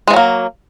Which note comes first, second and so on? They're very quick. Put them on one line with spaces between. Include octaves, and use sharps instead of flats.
G#3 E3 F#3 A#3